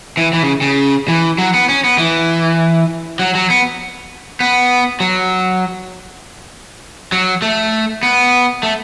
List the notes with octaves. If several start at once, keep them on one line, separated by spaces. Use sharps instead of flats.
E3
E3
C#3
C#3
E3
F#3
B3
C#4
B3
E3
F#3
F#3
B3
B3
F#3
F#3
A3
B3
A3